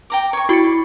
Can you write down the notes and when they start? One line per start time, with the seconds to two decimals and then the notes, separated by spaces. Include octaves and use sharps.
0.10 G5 A#5 D6
0.33 C#5 C#6
0.49 E4 F#4 D5 B5 C#7